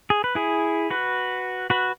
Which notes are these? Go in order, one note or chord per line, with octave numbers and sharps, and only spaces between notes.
G#4
B4
E4 G#4
F#4 B4
F#4 B4